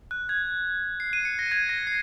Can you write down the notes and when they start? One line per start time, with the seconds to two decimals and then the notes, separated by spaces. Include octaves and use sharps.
0.11 F#6
0.29 G#6
1.00 C7
1.13 D#7
1.25 C#7
1.39 A#6
1.51 G#6
1.69 A#6
1.87 C7